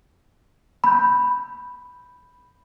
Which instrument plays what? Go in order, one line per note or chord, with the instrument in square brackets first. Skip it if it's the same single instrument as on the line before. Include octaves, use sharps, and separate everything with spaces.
[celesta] B5 G6